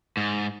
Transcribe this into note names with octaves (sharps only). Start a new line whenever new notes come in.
G#2